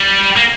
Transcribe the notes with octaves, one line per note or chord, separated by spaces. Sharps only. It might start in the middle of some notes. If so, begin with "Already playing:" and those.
Already playing: G3
A#3